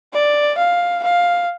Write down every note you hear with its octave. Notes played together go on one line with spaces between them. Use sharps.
D5
F5
F5